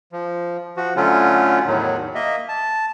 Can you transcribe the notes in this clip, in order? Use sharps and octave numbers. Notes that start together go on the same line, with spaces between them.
F3
F3 F#4
D3 F#3 A3 C#4 F4
E2 A2 D#3 F#3
A#3 D#5 E5
A5